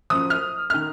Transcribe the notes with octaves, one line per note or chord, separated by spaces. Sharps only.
F#2 F3 D#6
F6
D#3 F6